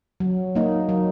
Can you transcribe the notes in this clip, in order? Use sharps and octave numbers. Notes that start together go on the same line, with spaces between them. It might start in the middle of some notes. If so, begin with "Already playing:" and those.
F#3
A#3 D#4
F#3